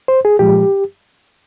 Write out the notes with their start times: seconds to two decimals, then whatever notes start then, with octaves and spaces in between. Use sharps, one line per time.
0.08 C5
0.25 G#4
0.39 A#2 F3 G#3 G4